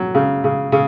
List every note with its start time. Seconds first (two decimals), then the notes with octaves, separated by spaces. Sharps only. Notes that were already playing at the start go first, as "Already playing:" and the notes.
Already playing: F#3
0.15 C#3
0.44 C#3
0.72 C#3